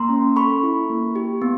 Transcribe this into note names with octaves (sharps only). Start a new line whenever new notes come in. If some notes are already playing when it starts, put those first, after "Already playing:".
Already playing: A#3 A#5 C6
C#4
A4 B5 C#6
E4
A#3
G4
B3